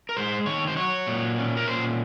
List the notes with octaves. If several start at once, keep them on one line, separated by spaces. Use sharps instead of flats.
A#4
G#3 C5
D#3 C#5
C5
F#3 C#5
A#2
C#4
A#4
A#2 C5